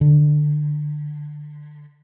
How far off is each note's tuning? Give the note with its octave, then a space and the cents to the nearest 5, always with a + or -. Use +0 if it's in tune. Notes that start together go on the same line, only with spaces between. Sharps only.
D3 +20